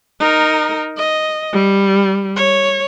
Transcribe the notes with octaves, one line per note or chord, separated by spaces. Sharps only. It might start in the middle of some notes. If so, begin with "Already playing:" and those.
D#4 A#4
D#5
G3
C#5